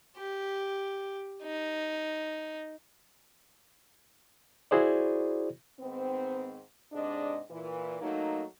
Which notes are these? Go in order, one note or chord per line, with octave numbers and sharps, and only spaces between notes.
G4
D#4
E4 F#4 G#4 C5 D5
G#2 D#3 B3 C4
G#2 C3 G#3 D4 D5 D#5
A#2 E3
F#3 A3 A#3 D#4